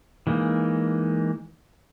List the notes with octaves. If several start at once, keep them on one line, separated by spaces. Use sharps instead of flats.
E3 G#3 A#3 D#4